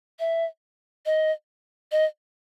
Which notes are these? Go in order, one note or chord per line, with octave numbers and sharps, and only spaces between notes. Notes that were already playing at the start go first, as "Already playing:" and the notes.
E5
D#5
D#5